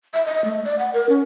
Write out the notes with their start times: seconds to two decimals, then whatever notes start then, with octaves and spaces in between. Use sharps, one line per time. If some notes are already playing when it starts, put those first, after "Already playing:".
0.14 E5
0.26 D#5
0.45 A3
0.65 D5
0.79 F#5
0.94 A#4
1.09 C#4